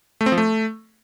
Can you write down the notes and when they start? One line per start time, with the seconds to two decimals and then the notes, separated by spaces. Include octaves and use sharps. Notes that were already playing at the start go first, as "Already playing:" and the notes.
0.21 A3
0.26 C4
0.32 F3
0.38 A3